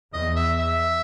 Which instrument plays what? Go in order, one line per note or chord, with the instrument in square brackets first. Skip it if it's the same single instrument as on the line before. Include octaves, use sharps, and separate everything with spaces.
[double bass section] E2 [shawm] D#5
[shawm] E5
E5